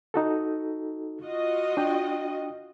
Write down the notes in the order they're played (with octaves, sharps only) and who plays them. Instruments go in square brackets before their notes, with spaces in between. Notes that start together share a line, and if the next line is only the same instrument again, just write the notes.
[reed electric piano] D#4 F#4 A4
[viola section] F4 F#4 D#5
[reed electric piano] D4 G5